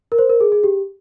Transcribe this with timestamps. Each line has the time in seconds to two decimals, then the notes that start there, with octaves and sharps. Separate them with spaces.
0.12 A#4
0.18 C5
0.30 A#4
0.41 G#4
0.52 G#4
0.64 G4